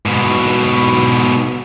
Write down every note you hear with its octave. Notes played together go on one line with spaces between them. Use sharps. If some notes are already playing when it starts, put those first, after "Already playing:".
G#2 B2